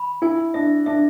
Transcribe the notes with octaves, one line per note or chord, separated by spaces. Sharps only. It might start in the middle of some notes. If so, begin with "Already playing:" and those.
Already playing: B5
E4 G#5
D4 E5
D4 E5